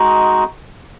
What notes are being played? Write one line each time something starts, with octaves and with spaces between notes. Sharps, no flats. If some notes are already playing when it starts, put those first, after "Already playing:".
Already playing: G#3 D#4 F#4